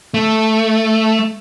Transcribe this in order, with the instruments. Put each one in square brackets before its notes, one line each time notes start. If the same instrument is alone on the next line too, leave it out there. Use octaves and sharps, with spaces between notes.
[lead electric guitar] A3